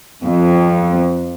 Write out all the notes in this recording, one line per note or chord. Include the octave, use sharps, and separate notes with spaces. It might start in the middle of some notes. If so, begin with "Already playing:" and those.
F2